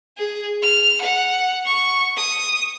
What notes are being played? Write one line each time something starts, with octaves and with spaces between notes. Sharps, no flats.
G#4
F6
F#5
C#6
D#6